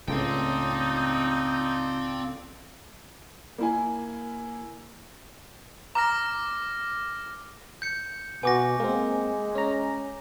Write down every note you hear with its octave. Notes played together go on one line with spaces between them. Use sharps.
C#2 A2 C4 D#4 F4 A4 D5 G5
A#3 E4 G#5
A#5 D6 F6 A#6
G6 C#7
B2 B3 F#4 G#5 D6 A#6
G#3 A#3 C4
C#4 A#5